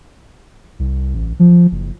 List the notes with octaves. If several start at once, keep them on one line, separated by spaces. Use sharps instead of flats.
C2
A1
F3
F#1